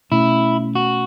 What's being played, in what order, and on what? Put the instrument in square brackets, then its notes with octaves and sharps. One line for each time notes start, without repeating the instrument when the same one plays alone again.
[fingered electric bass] B2 A3 C#4 [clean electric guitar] E4
[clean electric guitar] F#4